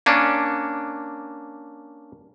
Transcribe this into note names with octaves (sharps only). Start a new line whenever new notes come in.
A#3 C#4 D4